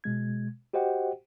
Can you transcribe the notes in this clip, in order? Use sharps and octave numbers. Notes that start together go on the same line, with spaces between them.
B2 G#3 G#6
F#4 G4 C5 D#5 F#5 G5